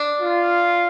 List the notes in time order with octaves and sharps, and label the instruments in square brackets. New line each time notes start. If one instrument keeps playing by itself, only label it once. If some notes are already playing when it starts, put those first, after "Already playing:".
Already playing: [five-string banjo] D4
[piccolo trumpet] F4